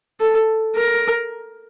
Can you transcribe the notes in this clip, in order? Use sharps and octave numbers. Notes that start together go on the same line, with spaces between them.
A4
A#4